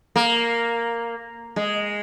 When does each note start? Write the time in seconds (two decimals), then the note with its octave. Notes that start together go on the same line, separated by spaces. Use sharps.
0.16 A#3
1.56 G#3